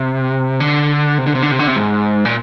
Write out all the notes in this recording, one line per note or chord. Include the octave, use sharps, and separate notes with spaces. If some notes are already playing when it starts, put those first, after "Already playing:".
Already playing: C3
D3
C3
D3
C3
D3
C3
D3
C3
G#2
A#2